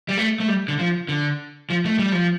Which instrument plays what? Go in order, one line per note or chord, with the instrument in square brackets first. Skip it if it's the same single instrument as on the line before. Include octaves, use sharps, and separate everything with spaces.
[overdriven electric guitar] G3
A3
A3
G3
D3
F3
D3
F3
A3
G3
F3